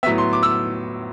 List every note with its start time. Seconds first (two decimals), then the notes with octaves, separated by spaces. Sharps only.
0.03 A2 F#3 B3 E5
0.18 C6
0.33 D6
0.43 E6